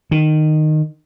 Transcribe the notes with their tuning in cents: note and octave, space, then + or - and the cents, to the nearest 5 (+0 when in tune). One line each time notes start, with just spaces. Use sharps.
D#3 -15